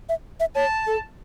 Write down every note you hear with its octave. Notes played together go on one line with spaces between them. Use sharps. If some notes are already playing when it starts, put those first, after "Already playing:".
E5
E5
C#5 A5
A4